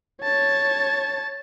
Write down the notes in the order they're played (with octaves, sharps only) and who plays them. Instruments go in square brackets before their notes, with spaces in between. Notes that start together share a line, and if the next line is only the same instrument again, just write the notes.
[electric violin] C#5 A5